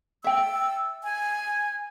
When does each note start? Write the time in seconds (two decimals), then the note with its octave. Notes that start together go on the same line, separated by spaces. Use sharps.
0.24 E5 G5 E6
1.04 G#5